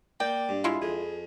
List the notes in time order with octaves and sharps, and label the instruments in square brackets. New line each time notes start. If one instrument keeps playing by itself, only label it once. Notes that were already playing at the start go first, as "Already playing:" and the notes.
[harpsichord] A#3 [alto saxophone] D5 [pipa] G5
[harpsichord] G2
[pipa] G#3 E4 F4
[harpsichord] F2 [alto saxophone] G#4